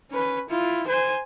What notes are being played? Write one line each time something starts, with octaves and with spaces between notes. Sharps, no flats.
C#4 B4
E4 F4
C5 G#5